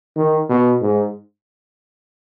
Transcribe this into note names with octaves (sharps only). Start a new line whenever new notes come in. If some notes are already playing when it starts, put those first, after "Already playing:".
D#3
B2
G#2